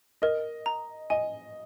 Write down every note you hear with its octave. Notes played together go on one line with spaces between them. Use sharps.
A#4 D#5
A#5
D#5 G#5